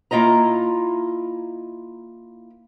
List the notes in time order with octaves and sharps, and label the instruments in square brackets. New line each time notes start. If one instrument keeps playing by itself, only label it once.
[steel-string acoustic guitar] A#3 E4 F4 D#5 A#5